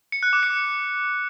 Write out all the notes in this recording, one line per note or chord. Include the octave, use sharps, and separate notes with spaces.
C#7
F#6
D6
C#7